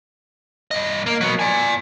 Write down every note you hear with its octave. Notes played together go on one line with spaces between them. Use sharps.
G2 D#5
A#3
F#3 B3
D5 G#5